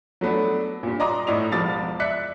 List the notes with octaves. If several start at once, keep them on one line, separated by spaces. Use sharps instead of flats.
F#3 A3 B3 D4
G2 A#2
D5 D#5 A#5 C6 D6 D#6
A2 E4 D5 D#6 F7
E1 F3 B3 D6 A6
D5 E5 F#6 B6 C#7